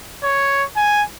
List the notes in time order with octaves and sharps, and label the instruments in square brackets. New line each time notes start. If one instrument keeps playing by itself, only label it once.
[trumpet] C#5
G#5